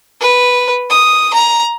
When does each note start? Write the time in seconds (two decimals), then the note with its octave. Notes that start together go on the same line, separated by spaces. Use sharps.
0.21 B4
0.90 D#6
1.34 A#5